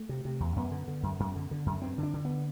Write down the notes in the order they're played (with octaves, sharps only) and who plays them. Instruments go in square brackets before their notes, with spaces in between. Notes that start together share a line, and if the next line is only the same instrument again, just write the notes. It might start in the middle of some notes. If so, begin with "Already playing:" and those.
Already playing: [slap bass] A3
C3
C3
E2
F#2 B3
D3
D3
F#2
F#2
D3
D3
F#2
G2 C4
D3
D4
D3
B3